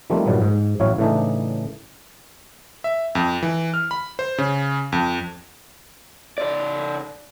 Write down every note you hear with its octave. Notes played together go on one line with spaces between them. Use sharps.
D#3 F3 G3 A3 A#3 C4
G2 A#2 D#3 F#3 B3
G#2
A1 F#3 E4 C#5 F5
A2 C#3 E3 A3 D4 D#4
E5
F2
E3
F6
B5
C5
C#3
F2
C#3 D5